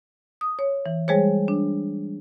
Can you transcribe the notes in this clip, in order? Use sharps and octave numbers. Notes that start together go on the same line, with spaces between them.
D#6
C#5
E3
G3 G#3 G#4 C5 C#5
D4